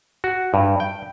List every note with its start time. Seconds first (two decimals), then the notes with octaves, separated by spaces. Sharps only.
0.24 F#4
0.54 G2
0.80 G5